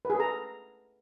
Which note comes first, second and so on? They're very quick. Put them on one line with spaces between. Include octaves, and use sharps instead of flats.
B4 G#4 A4 A#5